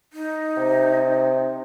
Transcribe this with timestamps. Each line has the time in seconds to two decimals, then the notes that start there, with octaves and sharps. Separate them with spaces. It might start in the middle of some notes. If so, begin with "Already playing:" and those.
0.13 D#4
0.57 C3